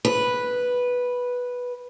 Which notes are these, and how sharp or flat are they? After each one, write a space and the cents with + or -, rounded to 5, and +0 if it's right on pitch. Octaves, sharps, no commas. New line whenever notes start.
B4 -5